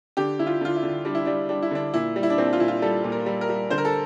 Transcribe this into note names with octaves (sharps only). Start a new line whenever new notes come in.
D3 G4
D3 E4
F4
D3 F4
E4
D3
G3 D4
E4
G3 D4
G3 D4
E4
D3 D4
A#2 E4
G3
E4
D4
A#2 C4
D4
F4
A#2 E4
F4
G3 A4
A#2
A#4
G3
A#4
G3
D3 C5
A#4
A4